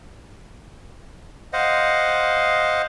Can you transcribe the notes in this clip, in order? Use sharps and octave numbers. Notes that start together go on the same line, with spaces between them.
C5 D#5 F5 F#5